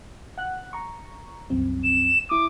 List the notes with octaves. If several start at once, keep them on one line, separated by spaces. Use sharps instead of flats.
F#5 F#6
A#5 C#6
C2 F#2 C4
E7
E4 D6 D#6